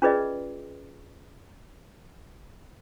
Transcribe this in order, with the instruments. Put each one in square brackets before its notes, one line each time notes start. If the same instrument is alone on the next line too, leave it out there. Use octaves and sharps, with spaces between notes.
[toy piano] C#4 F4 G#4 B4 D5 D#5